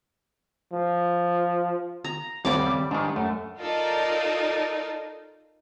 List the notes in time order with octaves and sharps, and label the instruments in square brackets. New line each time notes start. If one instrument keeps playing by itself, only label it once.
[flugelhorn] F3
[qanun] A#5
[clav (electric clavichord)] D2 G2 G3 [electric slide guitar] D#3 C4 C#5 [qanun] D5 D6
[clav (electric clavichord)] G3
[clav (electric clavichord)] G#2 D#3 [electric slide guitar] D4 G4
[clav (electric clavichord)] F#2 [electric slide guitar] A3
[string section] D#4 F4 A4 A#4 D5